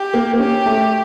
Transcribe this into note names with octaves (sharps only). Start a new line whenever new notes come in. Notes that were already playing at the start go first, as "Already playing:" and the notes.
Already playing: G4
A#3
A#3
C#4 G4
A3